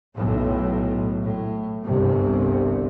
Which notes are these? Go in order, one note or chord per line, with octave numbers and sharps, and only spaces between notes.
B1 A2
A2
G1 C2 C3